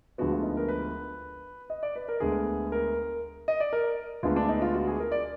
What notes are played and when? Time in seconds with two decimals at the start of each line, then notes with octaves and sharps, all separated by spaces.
0.18 D2 D3 F3 G#3 B3 F#4
0.32 F4
0.43 D#4
0.57 A#4
0.69 B4
1.70 D#5
1.83 D5
1.96 B4
2.08 A#4
2.20 D2 D3 G#3 B3 G#4
2.72 A#4
3.48 D#5
3.60 D5
3.73 A#4
4.23 D2 D3 G#3 B3 F4
4.36 D4
4.49 D#4
4.62 F4
4.74 F#4
4.88 G#4
5.00 A#4
5.12 D5